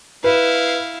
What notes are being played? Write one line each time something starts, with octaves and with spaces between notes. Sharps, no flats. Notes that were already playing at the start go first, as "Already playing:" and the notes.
E4 B4 F5